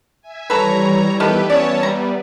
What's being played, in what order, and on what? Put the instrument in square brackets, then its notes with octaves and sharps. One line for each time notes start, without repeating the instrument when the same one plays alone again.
[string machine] E5 G#5
[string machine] E3 G3 [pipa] A4 B4 [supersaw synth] C#5 A#5
[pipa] D#3 A3 [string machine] B3 E5 [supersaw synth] G4 B4
[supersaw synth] C#4 C#5 A5 [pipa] D5
[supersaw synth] G3 [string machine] B3 B4 D5 [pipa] A#5